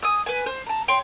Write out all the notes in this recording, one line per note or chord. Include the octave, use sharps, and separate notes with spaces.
G#5 D#6 E6
B4 G#5
C5
A5 A#5
C#5 G5 C6